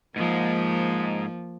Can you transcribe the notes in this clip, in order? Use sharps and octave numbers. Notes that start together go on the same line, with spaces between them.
G#2 F3 G#3 A#3